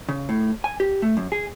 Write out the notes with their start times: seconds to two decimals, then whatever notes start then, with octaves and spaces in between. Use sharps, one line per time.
0.09 C#3
0.29 A2
0.64 G#5
0.80 G4
1.02 A3
1.17 F#2
1.32 G#4